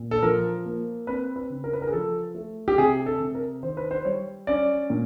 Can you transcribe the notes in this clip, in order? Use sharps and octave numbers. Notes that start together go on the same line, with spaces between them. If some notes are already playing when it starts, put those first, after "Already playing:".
Already playing: A#2
A4
F3 A#4
A#3
C4 B4
B4
C#3
A#4
B4
A#4
G#4
F3 A4
A3
G4
C3 G#4
A4
C3
A#4
D#3 C5
B4
C5
G3 C#5
C#4 D5
A#2